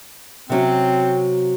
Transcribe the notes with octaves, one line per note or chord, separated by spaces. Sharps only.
C3 F#3 C4 C#4